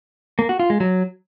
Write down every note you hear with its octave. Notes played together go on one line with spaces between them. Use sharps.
A#3
F#4
F4
G#3
F#3